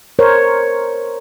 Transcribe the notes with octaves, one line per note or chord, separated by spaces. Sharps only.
A#4 C5 C#5